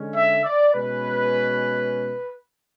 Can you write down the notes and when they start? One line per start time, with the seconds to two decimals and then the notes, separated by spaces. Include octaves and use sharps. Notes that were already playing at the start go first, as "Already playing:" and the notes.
Already playing: D3 G#3 C#4
0.16 E5
0.44 D5
0.74 B2 G#3 C#4 B4